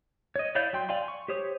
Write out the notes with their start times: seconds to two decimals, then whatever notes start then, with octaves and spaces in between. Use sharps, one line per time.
0.36 C#5 D#5
0.55 E4 C#5 D5 F5 G6
0.73 F#3 G5 C6
0.89 D5 F5 G5 G#5 C6
1.08 C#6
1.28 G4 C5 C#5 D#6